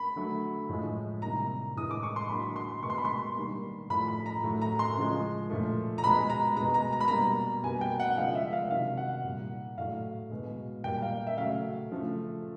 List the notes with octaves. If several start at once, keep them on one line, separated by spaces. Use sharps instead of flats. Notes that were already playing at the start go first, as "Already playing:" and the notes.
Already playing: B5
D3 F#3 A3
A2 F3 G#3
C3 D#3 G3 A#3 A#5
A2 E3 G#3 D#6
D6
C#6
C6
D3 F#3 A#3 B5
C6
B2 G#3 C#6
C6
B5
C6
D#3 G3 A#3
A2 F3 A3 B5
B5
A#5
A2 F#3 A3
A#5
C6
C#3 F3 G#3
A#2 F3 A3
A#5
B2 G#3 B5
A#5
B2 G#3 A#5
A#5
A#5
B5
B2 G3 A#3 A#5
B2 G3 A#3 G#5
G5
F#5
C#3 F3 G#3 F5
E5
F5
C3 D#3 F#3 F5
F#5
A#2 G3 A#3
A2 F#3 A3 F5
B2 G#3
A#2 G3 A#3 G5
F5
E5
C#3 F#3 A3 F5
C#3 F3 A3